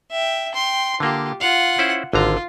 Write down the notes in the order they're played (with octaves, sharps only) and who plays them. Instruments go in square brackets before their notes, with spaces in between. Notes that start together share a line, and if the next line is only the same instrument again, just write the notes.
[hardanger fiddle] E5 G5
G5 C6
[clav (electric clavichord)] D3 A#3 [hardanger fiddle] F4 G4
[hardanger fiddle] F4 F#5 [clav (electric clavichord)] F5
[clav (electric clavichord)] C#4 E4 C5
[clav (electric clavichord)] G#1 D3 A#5 [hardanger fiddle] F4